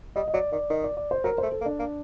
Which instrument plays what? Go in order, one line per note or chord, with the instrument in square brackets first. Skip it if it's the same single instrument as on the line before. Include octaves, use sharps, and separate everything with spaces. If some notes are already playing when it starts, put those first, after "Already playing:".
[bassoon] G3 [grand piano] D#5
[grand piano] D#5
[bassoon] F#3 [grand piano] D5
[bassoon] D#3 [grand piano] D5
[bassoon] D#3 [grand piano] D#5
[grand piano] D5
D5
C5
[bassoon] F#3 [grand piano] A#4
[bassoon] A3 [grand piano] C5
[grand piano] A4
[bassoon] A#3
[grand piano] D4
[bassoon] A#3